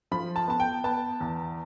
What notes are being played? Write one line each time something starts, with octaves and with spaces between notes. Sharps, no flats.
F3 B5
A5
B3 A5
G5
B3 A5
E2